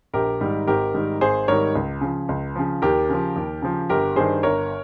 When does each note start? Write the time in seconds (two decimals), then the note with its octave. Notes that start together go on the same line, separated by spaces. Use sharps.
0.13 A#1 G4 A#4
0.40 G#2 D#3 G3
0.67 G#1 G4 A#4
0.94 G#2 D#3 G3
1.21 G#1 G#4 C5
1.48 G#2 D#3 G3 A#4 C#5
1.75 C#2
2.01 C#3 F3
2.29 C#2
2.56 C#3 F3
2.82 D#2 G4 A#4
3.09 C#3 F3
3.36 D#2
3.62 C#3 F3
3.89 G1 G4 A#4
4.16 G2 D#3 G3 G#4 C5
4.43 G1 A#4 C#5